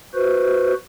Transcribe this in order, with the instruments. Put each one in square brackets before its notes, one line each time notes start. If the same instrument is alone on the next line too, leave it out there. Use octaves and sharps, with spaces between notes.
[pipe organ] F#4 B4 C5